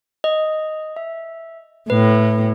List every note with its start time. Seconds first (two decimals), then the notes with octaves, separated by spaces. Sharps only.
0.24 D#5
0.96 E5
1.90 A2 B4